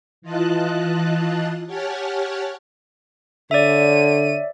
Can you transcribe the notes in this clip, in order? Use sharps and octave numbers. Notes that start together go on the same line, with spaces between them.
E3 F4 D#5 A5 F#6
G4 C#5 F#5 G#5 A5 F6
D3 C#5 D5 E5 D#7